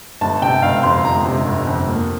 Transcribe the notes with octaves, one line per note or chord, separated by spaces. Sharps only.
G1 A5
C3 G5
G1 F5
F2 C6
G1 A#5
C3
G1
F2
A#3